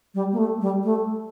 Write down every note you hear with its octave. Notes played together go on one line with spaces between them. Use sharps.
G3
A#3
A3
G3
A3